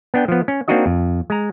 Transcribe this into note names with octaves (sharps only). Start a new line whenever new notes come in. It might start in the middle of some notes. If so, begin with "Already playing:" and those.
B3 D4 G5
F3 B3
C#4
A#3 C4 D4 D#4 F#4 D#5
F2
G#3 A#5